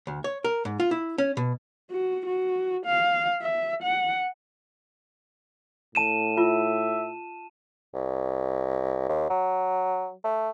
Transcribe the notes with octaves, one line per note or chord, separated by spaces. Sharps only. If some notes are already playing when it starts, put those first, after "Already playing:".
D2
C#5
A#4
G#2
F4
E4
C#4
B2
F#4
F#4
F5
E5
F#5
A2 A5 D#7 E7
F4 E5
C2
D#2
F#3
A3